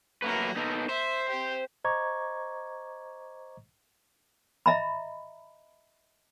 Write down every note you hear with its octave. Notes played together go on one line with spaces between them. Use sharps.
F#3 A3 A#3 A#4 B4
B3 D#4 A4
C5 E5
C4 G4
C5 D#5 A#5 C#6 D6 G#6
D#5 E5 A#5 B5